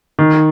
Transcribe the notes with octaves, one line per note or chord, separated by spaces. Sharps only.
D#3